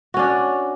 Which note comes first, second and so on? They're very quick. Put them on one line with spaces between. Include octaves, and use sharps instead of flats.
F#4 C#4 D4